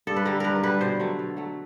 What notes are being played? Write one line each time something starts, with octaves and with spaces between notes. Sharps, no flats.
G2 A4
B4
D3 G3 A#4
G2 A#4 B4
D3 G3 B4
B2 C5
F#3 A3
B2
F#3 A3